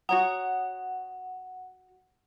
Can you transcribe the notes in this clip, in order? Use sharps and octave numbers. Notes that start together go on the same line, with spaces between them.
F#4 C#5 F#5 A#5